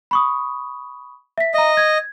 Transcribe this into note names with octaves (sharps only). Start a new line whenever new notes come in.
B5 C#6 D#6
E5 B6
D#5 E5 A#5
G#6